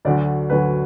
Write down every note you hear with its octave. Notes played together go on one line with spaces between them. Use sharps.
D2 D3 F#3 D5
D2 D3 F#3 B4